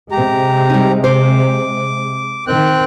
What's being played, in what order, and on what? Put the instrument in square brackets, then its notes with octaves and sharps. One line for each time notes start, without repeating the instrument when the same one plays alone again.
[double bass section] C3 G#3 [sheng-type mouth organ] G4 A#5
[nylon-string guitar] G3 D#4
[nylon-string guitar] C5 [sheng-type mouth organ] D6
[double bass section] D#3 [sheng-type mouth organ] C4 G5 F#6